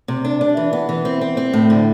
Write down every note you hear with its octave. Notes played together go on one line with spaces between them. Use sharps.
C3
D4
D4
E3
B3
E3
C4
C4
C4
A2
D3